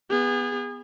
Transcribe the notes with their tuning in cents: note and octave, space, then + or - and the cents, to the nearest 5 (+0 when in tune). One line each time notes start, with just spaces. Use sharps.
B3 +0 G#4 -30